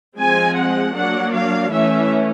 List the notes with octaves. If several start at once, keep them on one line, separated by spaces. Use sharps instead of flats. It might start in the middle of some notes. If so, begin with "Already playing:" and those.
F3 G#3 C4 G#5
F#5
F#3 A#3 D4 F#5
F5
E3 A3 C#4 E5